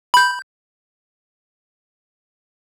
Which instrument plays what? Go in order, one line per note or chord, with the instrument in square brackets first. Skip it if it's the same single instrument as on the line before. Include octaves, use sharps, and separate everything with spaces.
[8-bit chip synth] B5 G6